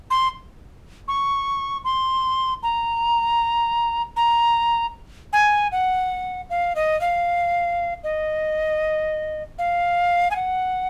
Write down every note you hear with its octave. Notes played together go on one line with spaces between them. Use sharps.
C6
C#6
C6
A#5
A#5
G#5
F#5
F5
D#5
F5
D#5
F5
G#5
F#5